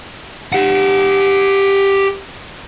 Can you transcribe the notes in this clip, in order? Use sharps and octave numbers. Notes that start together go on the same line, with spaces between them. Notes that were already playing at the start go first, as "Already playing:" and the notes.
G4 F#5